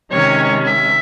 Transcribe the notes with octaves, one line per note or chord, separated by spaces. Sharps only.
C3 D#3 G#3 C#4 C#5
E5